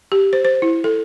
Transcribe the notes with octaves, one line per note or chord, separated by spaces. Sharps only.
G4
C5
C5
E4
A4